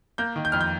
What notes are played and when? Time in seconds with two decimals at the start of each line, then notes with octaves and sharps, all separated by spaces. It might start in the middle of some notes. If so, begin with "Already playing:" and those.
0.18 A#3 G6
0.36 D#3
0.45 G6
0.52 F2 F6
0.61 G6